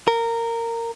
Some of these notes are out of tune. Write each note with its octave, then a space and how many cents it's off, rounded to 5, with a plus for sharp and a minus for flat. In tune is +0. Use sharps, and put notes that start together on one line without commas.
A#4 -15